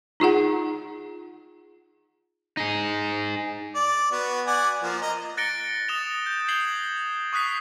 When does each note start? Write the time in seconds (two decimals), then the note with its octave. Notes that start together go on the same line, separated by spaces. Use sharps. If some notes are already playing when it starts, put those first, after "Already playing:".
0.20 D#4 F4 G#4 F#5
2.57 D#4 G#4
3.75 D5
4.12 B3 F#4
4.47 D5 F#5 G#5
4.83 F3 A#3
5.02 D#5 A#5
5.37 F#6 A6 A#6 C#7 D7 G7
5.88 D#6 A6 E7 F7 G7
6.26 G6
6.48 G#6 C7 F#7 G7
7.33 C#6 D#6 F#6 B6 C7